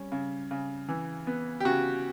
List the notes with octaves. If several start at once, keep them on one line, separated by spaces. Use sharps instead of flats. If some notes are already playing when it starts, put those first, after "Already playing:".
Already playing: G3 C#4
C#3
C#3
E3
B3
G4
C#3 F#4